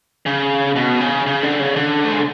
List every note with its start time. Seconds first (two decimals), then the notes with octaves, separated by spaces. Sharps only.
0.26 C#3
0.76 B2
1.00 C#3
1.26 C#3
1.43 D3
1.60 C#3
1.76 D3
2.04 A3
2.12 G#3